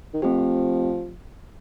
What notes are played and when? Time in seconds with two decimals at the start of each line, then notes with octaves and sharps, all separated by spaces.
0.14 D#3
0.22 F3 A3 C4 G4